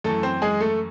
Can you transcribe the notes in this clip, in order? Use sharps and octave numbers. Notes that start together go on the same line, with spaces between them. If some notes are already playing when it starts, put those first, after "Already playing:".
F#2 E3 A3 A4
C4 C5
G#3 G#4
A3 A4